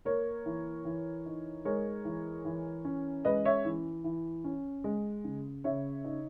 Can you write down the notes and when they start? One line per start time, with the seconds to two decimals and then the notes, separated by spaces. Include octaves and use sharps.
0.05 A#3 A#4 C#5
0.46 E3
0.85 E3
1.26 D#4
1.65 G#3 A#4 C#5
2.05 E3
2.45 E3
2.85 C#4
3.25 G#3 B4 D#5
3.45 C#5 E5
3.65 E3
4.04 E3
4.44 C#4
4.84 G#3
5.24 C#3
5.64 C#3 C#5 E5
6.04 D#4